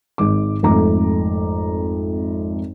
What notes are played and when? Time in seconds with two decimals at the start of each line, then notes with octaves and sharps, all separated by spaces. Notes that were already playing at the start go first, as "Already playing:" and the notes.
0.18 G#1 G#3 D6
0.63 G#1 F2 A3 A#5 D6